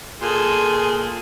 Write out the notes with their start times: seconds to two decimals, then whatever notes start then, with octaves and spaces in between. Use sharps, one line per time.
0.22 A#2 G#4 A4 C6